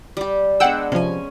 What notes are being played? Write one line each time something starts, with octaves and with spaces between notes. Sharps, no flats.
G3 G4
G#3 B3 D4 F#5 G5 E6
C3 F3 C#4 G#5